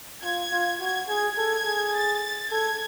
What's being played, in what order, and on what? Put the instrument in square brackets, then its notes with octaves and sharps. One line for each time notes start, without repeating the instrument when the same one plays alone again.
[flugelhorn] F4 [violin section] G#6
[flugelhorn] F4
[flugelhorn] F#4 [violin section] G#6
[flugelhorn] G#4 [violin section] G#6
[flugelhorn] A4 [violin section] G#6
[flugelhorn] G#4
[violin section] A6
[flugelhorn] A4 [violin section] G#6